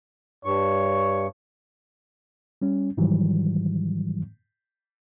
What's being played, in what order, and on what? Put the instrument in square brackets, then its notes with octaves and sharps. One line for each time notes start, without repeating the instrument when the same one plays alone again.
[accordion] G2 C#6 [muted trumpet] C#5
[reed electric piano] G3 C#4
G#2 D#3 E3 F#3 G3